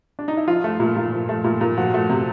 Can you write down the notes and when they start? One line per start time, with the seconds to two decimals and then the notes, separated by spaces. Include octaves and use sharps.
0.19 D4
0.28 D#4
0.37 E4
0.48 F3 F4
0.64 A3
0.80 A#2
0.96 A#2
1.13 F3
1.29 A3
1.44 A#2
1.61 A#2
1.77 F3 F#4
1.94 A3
2.10 C3